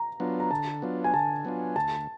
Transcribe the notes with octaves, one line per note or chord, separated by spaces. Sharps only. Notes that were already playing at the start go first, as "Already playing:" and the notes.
Already playing: A#5
F#3 B3 D4 F4
A#5
D3 A5
F#3 B3 D4 F4
G#5
D3 A5
F#3 B3 D4 F4
D2 A5